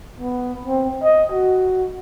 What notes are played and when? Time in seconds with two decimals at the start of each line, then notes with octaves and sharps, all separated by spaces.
0.20 B3
0.65 C4
1.03 D#5
1.32 F#4